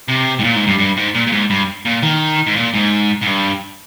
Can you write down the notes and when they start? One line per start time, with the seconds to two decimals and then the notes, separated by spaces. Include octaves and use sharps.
0.08 C3
0.39 G#2
0.44 A#2
0.56 G#2
0.67 G2
0.79 G2
0.97 G#2
1.15 A#2
1.27 A#2
1.32 G#2
1.50 G2
1.85 A#2
2.03 D#3
2.47 G#2
2.56 A#2
2.74 G#2
3.22 G#2
3.27 G2